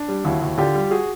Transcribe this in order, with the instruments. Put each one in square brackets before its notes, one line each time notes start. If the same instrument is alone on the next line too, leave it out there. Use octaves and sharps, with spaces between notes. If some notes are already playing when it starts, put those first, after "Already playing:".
Already playing: [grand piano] D4
G3
D#2 E4 F#4
D#2
D3 F4 G4
G3
F#4 G#4